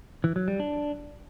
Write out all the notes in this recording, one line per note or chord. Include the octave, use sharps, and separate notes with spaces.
E3
F#3
G3
D4